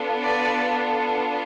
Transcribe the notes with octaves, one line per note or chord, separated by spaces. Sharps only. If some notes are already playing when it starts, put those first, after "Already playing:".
Already playing: B3 D4 F4 A4
B4 D5